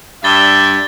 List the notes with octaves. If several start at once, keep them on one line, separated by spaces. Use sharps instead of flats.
G2 D5 E5 A6 G7